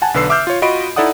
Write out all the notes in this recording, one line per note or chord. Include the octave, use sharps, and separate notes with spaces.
F#5 G#5 A5
B1 D3 B4 E6 C7
E5 D6 E6 F6 G6
F4 C#5
F4 F#4 D#5 B5 D7
D#4 E4 A4 D5 F#5 D#6